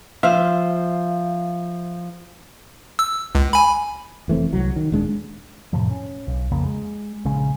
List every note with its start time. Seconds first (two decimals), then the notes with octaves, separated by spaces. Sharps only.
0.23 F3 C5 E5 F5
2.99 E6
3.35 C#2
3.53 G#5 B5
4.28 F1 E3 A3 C4
4.53 C2 F#3
4.76 D#3
4.92 D#1 G#3 D4
5.73 F2 A2 C3 F3
5.91 C#4
6.27 B1
6.52 F2 C#3 F3 A#3
6.66 G#3
7.25 A#1 C#3 G#3 C#4